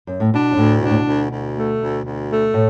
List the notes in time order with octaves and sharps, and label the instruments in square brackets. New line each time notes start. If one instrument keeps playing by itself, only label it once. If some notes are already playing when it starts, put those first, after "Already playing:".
[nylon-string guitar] F#2
A2
[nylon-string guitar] B2 [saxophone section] D4
[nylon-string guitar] F#2
[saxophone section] D2 [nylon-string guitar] A2
[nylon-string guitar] B2 [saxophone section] D4
[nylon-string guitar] A2
B2
[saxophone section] D2
D2
A3
D2
D2
A3
[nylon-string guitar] A2